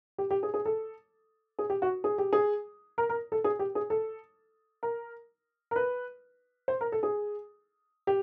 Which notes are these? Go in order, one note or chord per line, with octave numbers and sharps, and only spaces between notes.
G4
G4
G#4
G#4
A4
G#4
G4
F#4
G#4
G4
G#4
A#4
A#4
A4
G#4
G4
G#4
A4
A#4
A#4
B4
C5
A#4
A4
G#4
G4